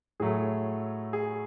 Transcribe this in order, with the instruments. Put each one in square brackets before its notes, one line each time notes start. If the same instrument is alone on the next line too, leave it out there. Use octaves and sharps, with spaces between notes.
[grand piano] A2 F#3 A3 G#4
G#4